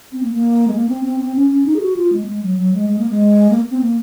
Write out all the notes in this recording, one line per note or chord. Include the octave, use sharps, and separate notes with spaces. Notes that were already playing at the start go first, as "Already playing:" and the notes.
C4
A#3
A#3
G#3
A#3
C4
C4
C4
C#4
C#4
D#4
G#4
F#4
F4
G#3
A#3
G#3
F#3
F#3
G#3
G#3
A#3
G#3
A#3
C4
A#3